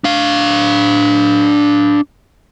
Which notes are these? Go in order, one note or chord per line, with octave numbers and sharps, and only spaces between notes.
D4 F5